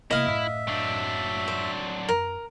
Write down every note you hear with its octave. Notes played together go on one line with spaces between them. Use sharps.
C3 A#3 E4 D#5 F5
F#2 A2 E5
F#3 D4
C5
F#2 A#4